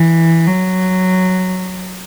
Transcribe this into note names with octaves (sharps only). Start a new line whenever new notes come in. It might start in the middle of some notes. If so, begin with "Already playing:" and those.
Already playing: E3
F#3